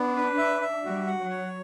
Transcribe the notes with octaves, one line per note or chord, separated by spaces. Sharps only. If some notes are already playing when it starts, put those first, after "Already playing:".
Already playing: B3 D4
B4
E5
E5
G3 F#4
F#5
F#3
C#5